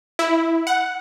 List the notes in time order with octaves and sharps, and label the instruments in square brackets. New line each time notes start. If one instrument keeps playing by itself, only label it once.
[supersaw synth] E4
F#5